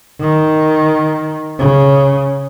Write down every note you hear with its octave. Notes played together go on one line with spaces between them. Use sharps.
D#3
C#3